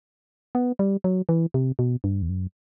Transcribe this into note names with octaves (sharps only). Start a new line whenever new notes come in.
B3
G3
F#3
E3
C3
B2
G2
E2
F#2